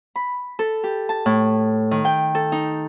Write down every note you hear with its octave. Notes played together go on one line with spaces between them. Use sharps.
B5
A4
G4
A5
A2
D#3
G5
A4
D#4